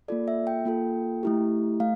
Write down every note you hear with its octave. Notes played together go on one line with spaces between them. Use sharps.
A#3 F4 A4 D5
E5
G5
A#3 F4 A4
A3 E4 G4
A3 F5